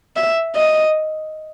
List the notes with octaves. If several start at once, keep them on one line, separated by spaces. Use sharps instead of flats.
E5
D#5